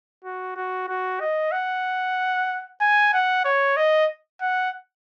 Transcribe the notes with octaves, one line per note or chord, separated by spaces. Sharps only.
F#4
F#4
F#4
D#5
F#5
G#5
F#5
C#5
D#5
F#5